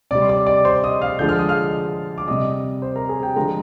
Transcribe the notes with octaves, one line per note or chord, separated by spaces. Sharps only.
C3 G3 D5 D6
C6
D5 D6
D5 D6
C5 C6
D#5 D#6
F5 F6
D3 F3 G#3 G6
F6
D#6
F5 F6
D6
C3 G3 D#5 D#6
C5 C6
A#4 A#5
G#4 G#5
G4 G5
D3 F3 G#3 A#4 A#5